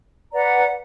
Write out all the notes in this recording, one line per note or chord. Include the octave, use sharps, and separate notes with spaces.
B4 D5 F#5 A#5